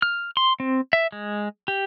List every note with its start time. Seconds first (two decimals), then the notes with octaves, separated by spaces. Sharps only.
0.02 F6
0.37 C6
0.60 C4
0.93 E5
1.12 G#3
1.68 G4